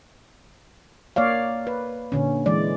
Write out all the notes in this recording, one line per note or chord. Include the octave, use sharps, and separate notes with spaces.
A#3 C#5 D5 F5
B4
A#2 D3 C#4
E3 G#3 D5